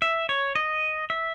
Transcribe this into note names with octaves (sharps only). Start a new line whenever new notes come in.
E5
C#5
D#5
E5